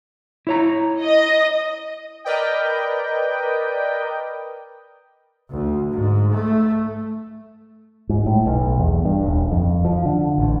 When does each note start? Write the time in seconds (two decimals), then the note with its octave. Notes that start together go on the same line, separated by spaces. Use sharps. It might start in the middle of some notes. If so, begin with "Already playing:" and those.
0.47 E4 C#5 A#5
1.01 D#5
2.24 A#4 B4 D5 D#5 G5
5.50 D2
5.92 G#2
6.33 A3
8.09 G#2
8.26 A2
8.46 B1
8.80 E2
9.05 G2
9.26 D#1
9.51 F2
9.84 F3
10.06 D3
10.38 A1